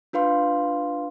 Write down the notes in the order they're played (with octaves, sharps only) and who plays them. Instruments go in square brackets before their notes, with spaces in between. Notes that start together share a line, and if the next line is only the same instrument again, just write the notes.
[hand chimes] D4 F4 B4 F5 C6